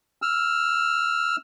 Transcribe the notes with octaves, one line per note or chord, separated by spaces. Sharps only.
E6 F6